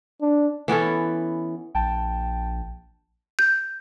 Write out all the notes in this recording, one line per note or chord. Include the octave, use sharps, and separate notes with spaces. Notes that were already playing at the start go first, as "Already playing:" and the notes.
D4
E3 B3 C#4 A4
A#1 G5 A5
G6